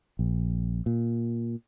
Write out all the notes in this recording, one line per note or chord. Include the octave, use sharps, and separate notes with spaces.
A#1
A#2